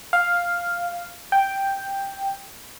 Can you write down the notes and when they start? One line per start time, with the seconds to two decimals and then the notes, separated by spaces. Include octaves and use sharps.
0.13 F5
1.32 G5